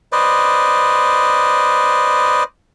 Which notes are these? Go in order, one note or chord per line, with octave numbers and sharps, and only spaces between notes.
B4 C5 D5 D#5